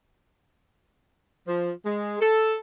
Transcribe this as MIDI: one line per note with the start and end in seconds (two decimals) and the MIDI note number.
1.46 1.70 53
1.85 2.19 56
2.20 2.56 69